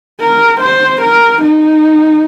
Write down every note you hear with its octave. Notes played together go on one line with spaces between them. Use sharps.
A#4
C5
A#4
D#4